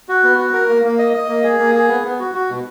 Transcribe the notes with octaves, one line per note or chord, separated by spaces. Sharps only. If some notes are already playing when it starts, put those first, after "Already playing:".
F#4
B3
F#4
A#4
A#3
A#3
D#5
D#5
A#3
G#4
A#3
G#4
B3
B3
F#4
F#4
B2